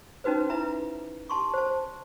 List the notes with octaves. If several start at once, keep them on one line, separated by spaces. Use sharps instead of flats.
C#4 D#4 F#4 B4 C5
E4 B4 E5 A#5
G4 A5 C6 C#6
C5 A5